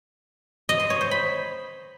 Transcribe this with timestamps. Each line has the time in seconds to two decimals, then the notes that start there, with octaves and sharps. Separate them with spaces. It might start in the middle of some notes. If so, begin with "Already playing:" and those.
0.69 D#5
0.80 C6
0.90 C#5
1.01 C5
1.11 B5